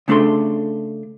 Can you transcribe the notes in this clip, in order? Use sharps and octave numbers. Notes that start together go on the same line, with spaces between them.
C#3 A3 D4 A4 C6